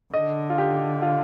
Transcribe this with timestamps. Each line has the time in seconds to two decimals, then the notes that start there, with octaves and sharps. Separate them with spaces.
0.14 D3 D#5
0.50 F4
0.58 G4
1.02 F4